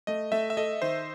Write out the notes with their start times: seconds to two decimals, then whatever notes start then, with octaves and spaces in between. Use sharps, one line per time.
0.07 A3 D#5
0.32 A3 E5
0.50 E5
0.57 A4 D#5
0.82 D#3 C5